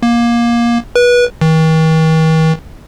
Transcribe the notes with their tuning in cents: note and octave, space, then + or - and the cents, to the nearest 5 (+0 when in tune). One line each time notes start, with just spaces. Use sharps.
A#3 +20
B4 -25
D#3 +45